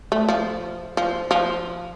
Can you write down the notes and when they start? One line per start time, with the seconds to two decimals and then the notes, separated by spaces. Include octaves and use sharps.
0.12 A3
0.29 F3
0.97 F3
1.31 F3